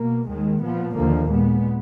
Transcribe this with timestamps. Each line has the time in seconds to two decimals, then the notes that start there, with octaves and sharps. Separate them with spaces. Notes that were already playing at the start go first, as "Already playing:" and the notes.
Already playing: B2 A#3
0.27 D#2 D#3 G#3
0.62 A#2 F3 B3
0.95 D#2 D3 F3 A#3
1.30 A#2 G#3 B3